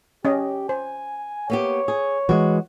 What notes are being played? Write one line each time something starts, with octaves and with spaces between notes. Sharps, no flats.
C#4 G4 D#5
C5 G#5
A#3 B3 G4 C#5
G#4
E3 F#3 G#3 F#4